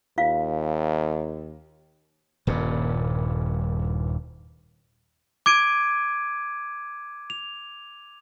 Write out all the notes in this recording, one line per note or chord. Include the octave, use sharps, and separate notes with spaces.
D#2 F4 F5
D#1 G2 A#2
D6 G#6 D7 D#7
F7